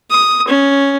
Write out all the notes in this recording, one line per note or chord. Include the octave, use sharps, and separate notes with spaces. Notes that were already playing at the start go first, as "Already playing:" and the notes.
D#6
C#4